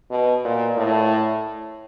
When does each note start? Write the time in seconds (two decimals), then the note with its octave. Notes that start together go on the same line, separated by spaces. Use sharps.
0.11 B2
0.45 A#2
0.77 A2